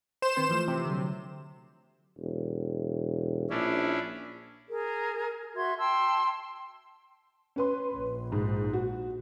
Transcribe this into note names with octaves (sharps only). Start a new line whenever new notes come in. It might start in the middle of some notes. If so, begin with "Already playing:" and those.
C5 E7
D#3 C4 B4
E3 F3 A3
C3
D3 F#3
E1
A#1 C#4 D4 E4
G#4 A#4
F#4 E5 C6 G#6
G5 A5 C6 E6
C#4 B4 C6
A#1
G#2
F#4